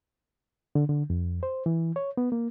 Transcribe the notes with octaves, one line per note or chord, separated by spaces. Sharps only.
D3
D3
F2
C5
E3
C#5
B3
A#3